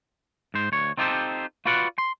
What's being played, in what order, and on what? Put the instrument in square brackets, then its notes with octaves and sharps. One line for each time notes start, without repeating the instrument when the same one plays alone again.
[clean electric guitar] G#2 C5
D2 C#5
C4 D#4 F4 G4 A4 C5
F4 F#4 B4 D5 F5 F#5
C6